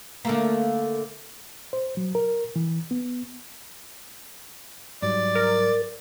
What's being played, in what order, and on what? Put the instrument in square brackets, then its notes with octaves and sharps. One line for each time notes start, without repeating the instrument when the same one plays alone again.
[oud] D3 A3 A#3
[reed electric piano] C5
F#3
A#4
E3
B3
[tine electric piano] G#2 F#3 G3 [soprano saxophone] D5
[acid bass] A#4